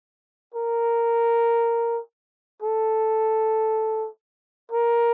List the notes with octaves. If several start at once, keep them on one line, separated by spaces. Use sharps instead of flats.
A#4
A4
A#4